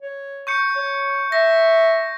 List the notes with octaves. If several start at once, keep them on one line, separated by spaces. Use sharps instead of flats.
C#5
C#6 G6 C#7
C#5
E5 A#6